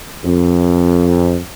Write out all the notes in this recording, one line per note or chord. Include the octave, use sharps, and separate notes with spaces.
F2